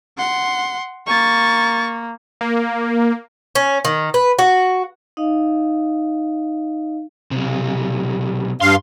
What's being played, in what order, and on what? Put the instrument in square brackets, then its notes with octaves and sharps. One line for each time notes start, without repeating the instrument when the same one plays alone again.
[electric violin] F#5 C6
[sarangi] A#3 [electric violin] C#6 A6
[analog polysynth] A#3
[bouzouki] C#4
D#3
B4
F#4
[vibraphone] D#4 D#5 F5
[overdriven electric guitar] B1 C3
[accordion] G2 F5 [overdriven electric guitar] C6